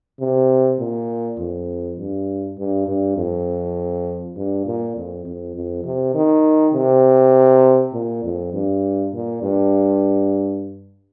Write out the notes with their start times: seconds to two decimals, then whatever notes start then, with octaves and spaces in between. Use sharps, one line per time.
0.20 C3
0.79 A#2
1.39 F2
1.98 G2
2.58 G2
2.87 G2
3.17 F2
4.36 G2
4.66 A#2
4.96 F2
5.25 F2
5.56 F2
5.85 C3
6.14 D#3
6.74 C3
7.93 A#2
8.24 F2
8.54 G2
9.13 A#2
9.42 G2